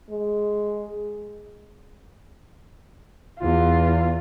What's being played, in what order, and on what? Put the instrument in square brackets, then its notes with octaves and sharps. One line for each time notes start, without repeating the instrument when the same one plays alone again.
[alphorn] G#3
[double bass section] E2 [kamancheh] F4